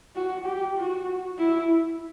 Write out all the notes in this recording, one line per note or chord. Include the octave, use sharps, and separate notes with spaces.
F#4
G4
F#4
E4